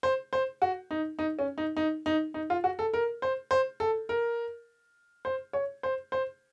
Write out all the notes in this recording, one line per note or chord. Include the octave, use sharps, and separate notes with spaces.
C5
C5
F#4
D#4
D#4
C#4
D#4
D#4
D#4
D#4
F4
F#4
A4
A#4
C5
C5
A4
A#4
C5
C#5
C5
C5